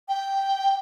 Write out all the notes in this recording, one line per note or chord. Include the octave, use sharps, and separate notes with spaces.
G5